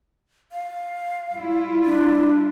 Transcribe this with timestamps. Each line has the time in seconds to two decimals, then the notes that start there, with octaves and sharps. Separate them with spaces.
0.52 F5
1.34 G3 E4 F4
1.85 D4